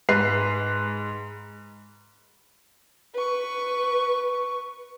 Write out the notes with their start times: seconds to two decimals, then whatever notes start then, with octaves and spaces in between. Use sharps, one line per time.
0.09 G#2 B4 C7
3.14 B4 C#6